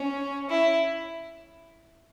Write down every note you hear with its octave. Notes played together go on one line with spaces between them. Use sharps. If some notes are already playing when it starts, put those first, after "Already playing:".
Already playing: C#4
E4